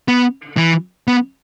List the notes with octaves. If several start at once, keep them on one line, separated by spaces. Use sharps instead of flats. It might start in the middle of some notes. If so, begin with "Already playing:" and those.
B3
E3
B3